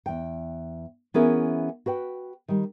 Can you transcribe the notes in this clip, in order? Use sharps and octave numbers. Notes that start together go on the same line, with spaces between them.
E2 G5
E3 B3 C#4 E4 G#4 A#4
F#4 B4 G5
D#3 G3